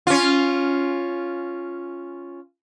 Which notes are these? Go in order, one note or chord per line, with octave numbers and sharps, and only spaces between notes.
C#4 F4